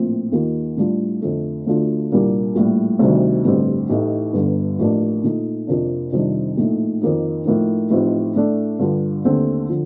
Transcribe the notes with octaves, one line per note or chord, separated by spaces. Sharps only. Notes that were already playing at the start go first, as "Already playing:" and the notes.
Already playing: A#1 A2 F3 C4
D#2 D#3 A#3 F4
A2 G3 D4 F4
F2 D3 A3
D2 D3 A3 D4 F4
C2 A#2 G3 A#3 D4
A#1 A2 G3
D2 C3 D#3 G3 D4
A1 G2 D3 G3 C4
A1 A2 A3 D#4
G1 G2 D3
A1 A2 F3 A#3 D4
A#2 A3 D#4
F2 C3 F3 A#3 D4
F2 C3 D#3 G3 D4
A#1 A2 A3 D#4
F2 D#3 A#3 D#4
A2 F3 A#3 D#4
A1 A2 F3 C4 D#4
A2 A3 D4
G2 D3 G3 D4 F4
D#2 D3 A3 C4
D3 F3